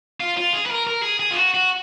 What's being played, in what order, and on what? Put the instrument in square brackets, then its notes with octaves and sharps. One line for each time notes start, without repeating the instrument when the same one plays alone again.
[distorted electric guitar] F4
F4
G#4
B4
A#4
A#4
G#4
G#4
F4
F#4
F#4